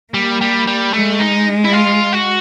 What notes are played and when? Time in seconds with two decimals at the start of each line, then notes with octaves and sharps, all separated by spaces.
0.14 G3 A#3
0.41 G3
0.67 G3
0.93 G#3 A3
1.19 D#4
1.64 E4
1.73 F4
2.13 F#4